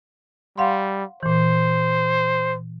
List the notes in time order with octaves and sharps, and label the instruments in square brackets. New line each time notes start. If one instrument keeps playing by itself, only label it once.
[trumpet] G3 [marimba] F5 F#5 C6
[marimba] A#2 E3 [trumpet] C5